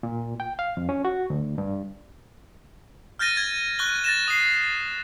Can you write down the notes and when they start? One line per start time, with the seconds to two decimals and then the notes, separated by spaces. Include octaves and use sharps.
0.03 A#2
0.40 G5
0.59 F5
0.77 F2
0.89 C#4
1.05 F#4
1.30 D2
1.58 G2
3.19 F6 G6 A6 A#6 D#7
3.36 G#6 A6
3.79 C#6 F#6 G7
4.04 A6 A#6 E7
4.28 D#6 C7